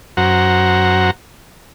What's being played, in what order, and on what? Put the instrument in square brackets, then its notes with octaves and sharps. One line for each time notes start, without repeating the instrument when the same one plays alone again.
[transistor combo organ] F#2 F#4 C5 F#5 A#5